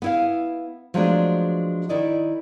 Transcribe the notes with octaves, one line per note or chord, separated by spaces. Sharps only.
B3 E4 F5
F3 F#3 G#3 A3 B3 D4
D#3 E4 D5 D#5